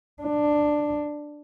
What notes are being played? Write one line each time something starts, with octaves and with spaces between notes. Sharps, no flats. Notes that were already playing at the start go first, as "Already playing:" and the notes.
D4